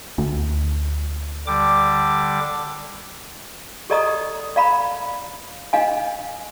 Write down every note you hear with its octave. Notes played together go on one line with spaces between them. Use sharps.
D2
D3 G3 D6
G4 A4 D5 D#5 A#5 D#6
D5 F5 A#5 B5
D4 D#5 F5 G#5